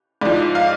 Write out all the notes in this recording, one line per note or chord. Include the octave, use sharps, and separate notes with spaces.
G#2 F3 D5
F5